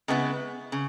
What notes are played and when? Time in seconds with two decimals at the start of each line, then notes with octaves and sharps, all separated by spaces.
0.08 C#3 G#3 B3 E4
0.72 C#3